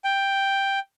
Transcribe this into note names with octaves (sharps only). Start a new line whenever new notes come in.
G5